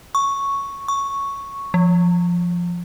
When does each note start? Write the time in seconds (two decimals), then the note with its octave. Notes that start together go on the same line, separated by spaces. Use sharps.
0.15 C#6
0.88 C#6
1.74 F3